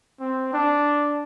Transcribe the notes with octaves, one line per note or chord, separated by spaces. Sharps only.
C4
D4